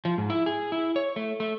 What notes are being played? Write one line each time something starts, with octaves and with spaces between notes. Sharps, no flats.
F3
G#2
E4
G#4
E4
C#5
A3
A3